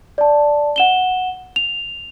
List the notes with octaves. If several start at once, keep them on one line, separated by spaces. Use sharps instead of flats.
D5 A5
F#5 E7 G7
F7